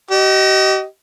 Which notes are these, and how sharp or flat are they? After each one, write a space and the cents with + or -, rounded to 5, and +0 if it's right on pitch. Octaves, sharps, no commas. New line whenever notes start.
G4 -40 D#5 +0